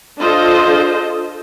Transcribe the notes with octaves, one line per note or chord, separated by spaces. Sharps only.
D4 F4 A4 C5 D#5